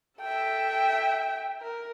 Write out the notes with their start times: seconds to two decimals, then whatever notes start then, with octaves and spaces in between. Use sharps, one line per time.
0.21 A4 E5 G5
1.62 A#4